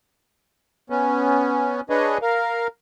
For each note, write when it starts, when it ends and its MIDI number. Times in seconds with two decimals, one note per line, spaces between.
0.90 1.81 59
0.90 1.81 61
1.90 2.18 62
1.90 2.18 68
1.90 2.18 71
1.90 2.18 73
1.90 2.18 75
2.22 2.67 70
2.22 2.67 77